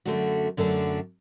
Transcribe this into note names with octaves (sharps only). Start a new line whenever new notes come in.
F#2 D3 A3 D4 F#4
F#2 D3 A3 D4 F#4